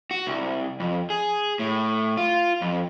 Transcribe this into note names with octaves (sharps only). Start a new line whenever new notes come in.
F#4
C2
F2
G#4
A2
F4
F2